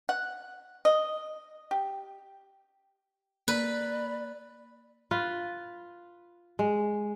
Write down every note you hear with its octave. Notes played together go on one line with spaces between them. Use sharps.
F#5
D#5
G4
A#3 B4 D5 B5
F4 B4
G#3